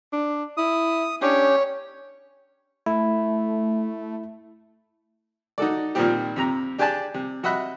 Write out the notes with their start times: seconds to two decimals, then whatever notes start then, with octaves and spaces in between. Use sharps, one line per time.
0.13 D4
0.57 E4 D#6
1.22 C#4 D4 G4 C#5
2.86 A3 E4
5.58 D#4 F#4 A4 D5
5.95 A#2 D#3 F3 G3 C4 G4
6.36 F2 C3 A#5
6.78 D4 G4 G#4 D5 G#5 A5
7.14 C3
7.43 C3 F#4 D#5 E5 B5 F#6